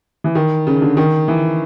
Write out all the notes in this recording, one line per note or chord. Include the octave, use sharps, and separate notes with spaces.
E3
D#3
C#3
D3
D#3
E3